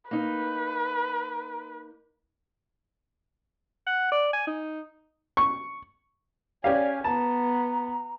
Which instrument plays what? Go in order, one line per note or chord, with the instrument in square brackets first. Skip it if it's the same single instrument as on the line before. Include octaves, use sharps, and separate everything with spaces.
[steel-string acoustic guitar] A#3 D#4 [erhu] B4
[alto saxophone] F#5
D5
G#5
D#4
[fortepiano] C#6
[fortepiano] C#4 G4 F5 [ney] D5 [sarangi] G#5
[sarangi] B3 [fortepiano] A5 [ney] A#5